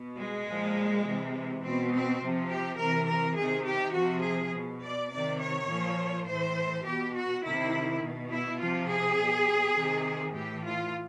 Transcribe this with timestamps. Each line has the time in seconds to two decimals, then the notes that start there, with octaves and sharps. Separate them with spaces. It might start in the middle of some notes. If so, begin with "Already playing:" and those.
Already playing: B2
0.18 G#3
0.47 A#2 F3
1.05 C3 E3
1.63 B2 C4
1.92 C4
2.21 C3 F3
2.50 G4
2.79 C3 E3 A#4
3.08 A#4
3.37 C3 D#3 G#4
3.67 G4
3.95 C3 F3 F#4
4.24 G#4
4.53 B2
4.82 D5
5.11 C3 D#3 D5
5.40 C#5
5.69 A#2 F3
6.27 A2 E3 C5
6.85 B2 G4
7.15 F#4
7.43 C3 D#3 E4
8.01 B2
8.30 E4
8.59 C3 F3 F4
8.88 G#4
9.17 B2
9.76 C3 D#3
10.33 A2 E3 G4
10.63 F4